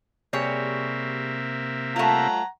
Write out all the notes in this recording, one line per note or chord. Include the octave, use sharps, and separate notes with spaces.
C3 G3 A#3 G#4 C#5 E5
A3 F4 F#5 A#5